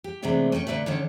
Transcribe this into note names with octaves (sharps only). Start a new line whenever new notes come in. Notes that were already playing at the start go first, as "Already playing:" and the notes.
G4
C3 E3 G#3 A3 B3 D4
A3 C#4 B4 G5
A#2 D3 F3 A3 B4
D3 D#3 C#4 A4